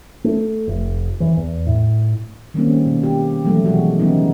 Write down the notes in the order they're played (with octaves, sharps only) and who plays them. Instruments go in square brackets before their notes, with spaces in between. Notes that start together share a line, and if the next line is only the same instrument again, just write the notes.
[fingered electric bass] A3
F1
E3
E2
A2
[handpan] D#3 G3 G#3 A#3 C4 C#4
B2
G4
E3 F#3 G3 A3
B2 E3 G#3 B3 F#4 G4
C#3 E3 G3 B3 C#4 D#4